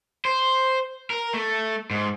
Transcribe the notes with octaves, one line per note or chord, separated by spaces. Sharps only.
C5
A#4
A3
G#2